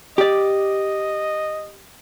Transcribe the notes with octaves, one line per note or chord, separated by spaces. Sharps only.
G4 D5 D#5